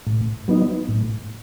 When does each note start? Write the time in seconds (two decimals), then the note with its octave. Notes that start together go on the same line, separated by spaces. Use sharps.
0.07 A2
0.48 F#3 B3 D#4
0.88 A2